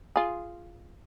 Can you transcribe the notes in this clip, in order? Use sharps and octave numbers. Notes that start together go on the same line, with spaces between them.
F4 G#4